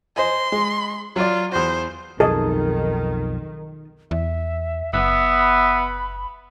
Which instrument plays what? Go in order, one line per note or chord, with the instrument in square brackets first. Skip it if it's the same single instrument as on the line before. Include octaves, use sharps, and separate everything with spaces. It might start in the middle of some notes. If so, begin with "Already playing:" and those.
[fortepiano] C5 D#5 G#5 [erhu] C6
[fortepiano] G#3
[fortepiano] F#3 D5 [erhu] F4
[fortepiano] E2 F#4 [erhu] C5
[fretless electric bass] B1 F2 [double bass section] D#3 [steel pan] G#4 [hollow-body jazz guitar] A4 D#5
[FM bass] E2 [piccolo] E5
[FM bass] F#1 [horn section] B3 [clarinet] E5 [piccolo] F#5
[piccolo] B5